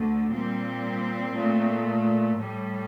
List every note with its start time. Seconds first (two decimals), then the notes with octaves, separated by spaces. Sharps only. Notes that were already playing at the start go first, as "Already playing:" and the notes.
Already playing: D2 D3 A3
0.31 A#2 G3 C4
1.33 A#2 A3
2.35 A2 G3